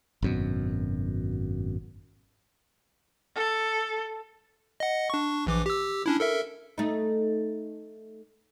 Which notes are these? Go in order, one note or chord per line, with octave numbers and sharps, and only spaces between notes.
G#1 F#2 B2
A4
D#5 F#5
D4 C#6
A#1 E3 D6
G4 E6
C#4 D4 E4
A4 A#4 E5
A3 D#4